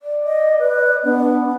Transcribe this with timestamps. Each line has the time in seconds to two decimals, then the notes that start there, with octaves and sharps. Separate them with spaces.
0.02 D5
0.25 D#5
0.59 B4
1.04 B3 D4